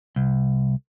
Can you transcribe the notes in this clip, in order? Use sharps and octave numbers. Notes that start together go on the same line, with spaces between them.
C2